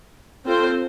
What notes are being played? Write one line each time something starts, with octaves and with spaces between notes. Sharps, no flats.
C4 F4 A4 C5